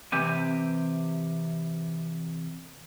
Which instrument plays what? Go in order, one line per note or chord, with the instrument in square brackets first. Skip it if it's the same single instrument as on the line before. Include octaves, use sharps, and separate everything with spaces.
[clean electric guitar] C3 E3 C4 G4 G#5